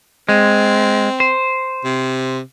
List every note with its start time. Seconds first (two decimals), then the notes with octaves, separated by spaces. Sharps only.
0.29 G#3 C4
1.20 C5
1.85 C3